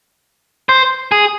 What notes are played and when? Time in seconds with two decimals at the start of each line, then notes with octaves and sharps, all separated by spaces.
0.69 C5
1.12 G#4